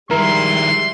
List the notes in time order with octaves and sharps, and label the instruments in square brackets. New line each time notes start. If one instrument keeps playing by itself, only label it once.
[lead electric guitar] D#3 E4 [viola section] G3 G#3 [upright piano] A#4 [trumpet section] C6